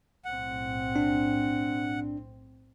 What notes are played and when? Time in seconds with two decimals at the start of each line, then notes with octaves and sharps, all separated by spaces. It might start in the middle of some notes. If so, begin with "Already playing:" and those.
0.25 B1 A2 C4 F#5
0.96 D4